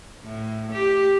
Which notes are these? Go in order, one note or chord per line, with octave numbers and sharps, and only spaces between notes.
A2
G4